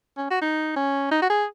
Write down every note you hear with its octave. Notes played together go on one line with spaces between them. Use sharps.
C#4
F#4
D#4
C#4
D#4
F#4
G#4